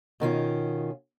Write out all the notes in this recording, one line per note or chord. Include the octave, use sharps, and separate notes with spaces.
B2 D#3 C#4 F4